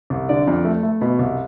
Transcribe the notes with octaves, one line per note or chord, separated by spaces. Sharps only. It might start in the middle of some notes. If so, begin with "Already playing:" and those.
C2
D3 D5
F2
A3
A3
B2
C2